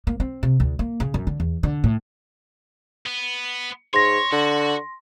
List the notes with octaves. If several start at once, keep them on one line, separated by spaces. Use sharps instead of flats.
A#3
C4
C3
D2
A#3
C#3
F#2
D3
E2
D3
A2
B3
G#2 C#5 C6 A#6
D3 F#4